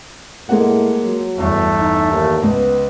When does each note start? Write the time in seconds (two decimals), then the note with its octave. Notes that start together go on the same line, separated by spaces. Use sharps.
0.49 A2 G#3 A#3 F#5
1.05 F#3
1.37 G1 E2 A3
1.79 D#4
2.11 D#2
2.43 C#2 B3